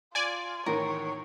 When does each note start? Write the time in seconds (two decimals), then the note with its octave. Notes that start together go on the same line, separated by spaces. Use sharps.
0.15 F4 D5 G#5
0.66 E2 A2 D#3 A#4 C#5